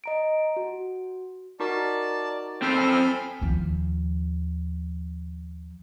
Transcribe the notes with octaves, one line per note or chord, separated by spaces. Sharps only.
D#5 A#5 D7
F#4
D#4 F#4 A#4 D5 A5
C4 A4 C5 G5 B5 F6
G#5
D#2 F3